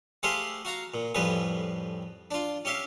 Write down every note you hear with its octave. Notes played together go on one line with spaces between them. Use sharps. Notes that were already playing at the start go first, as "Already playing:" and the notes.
A3 G4 G#4 C5 E5 F5
F#4 F5 A#5
A#2
F2 A2 F3 G3 G#4 B4
D4 F4
C#4 G4 E5 F5